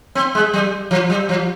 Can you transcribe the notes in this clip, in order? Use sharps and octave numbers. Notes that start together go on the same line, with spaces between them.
C4
G#3
G3
F3
G3
F3